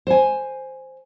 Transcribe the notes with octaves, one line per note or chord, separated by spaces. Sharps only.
C5 G#5